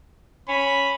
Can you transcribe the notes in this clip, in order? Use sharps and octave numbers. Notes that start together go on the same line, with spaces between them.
C#4 B5